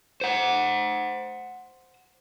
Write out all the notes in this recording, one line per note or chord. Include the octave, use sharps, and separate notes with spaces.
C5 F#5